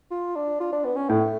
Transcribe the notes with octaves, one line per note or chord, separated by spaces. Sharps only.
F4
D4
F4
D4
B3
C#4
A2 A3